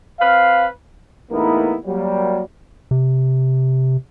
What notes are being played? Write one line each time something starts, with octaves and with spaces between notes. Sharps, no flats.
C4 B4 F5
E2 A2 A#3 B3 D#4 E4
F#3 G3 A#3
C3